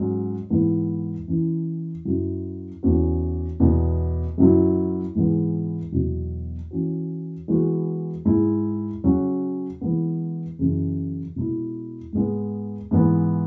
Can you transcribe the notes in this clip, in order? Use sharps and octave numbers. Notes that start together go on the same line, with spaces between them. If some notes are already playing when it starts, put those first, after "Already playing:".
Already playing: G#2 F#3 C#4
G#2 E3 B3 E4
E3 C#4 E4
F#2 F#3 E4
E2 E3 C#4 F#4
E2 B2 B3
F#2 F#3 E4
G#2 E3 G#3 B3 E4
E2 B2 F#3
E3 C#4 F#4
E3 G#3 B3 F#4
G#2 G#3 E4
C#3 F#3 C#4 F#4
E3 G#3 B3 E4
F#2 C#3 E3
B2 G#3 E4
G#2 G#3 B3
G#2 E3 B3